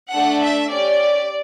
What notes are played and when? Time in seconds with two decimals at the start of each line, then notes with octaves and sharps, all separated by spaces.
0.11 A3 D4 A4 F#5
0.39 E5
0.68 C#4 G4 D5